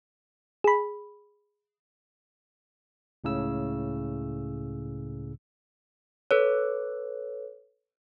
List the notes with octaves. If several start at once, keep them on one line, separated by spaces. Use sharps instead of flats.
G#4 B5
C#2 A2 C#3 E6
A4 B4 C#5